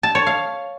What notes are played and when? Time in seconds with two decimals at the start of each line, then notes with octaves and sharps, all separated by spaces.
0.03 A5
0.15 C#5
0.27 F5